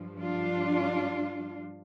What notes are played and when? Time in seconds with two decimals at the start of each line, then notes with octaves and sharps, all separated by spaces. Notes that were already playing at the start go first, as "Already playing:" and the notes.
Already playing: G2 F3
0.20 D4 F4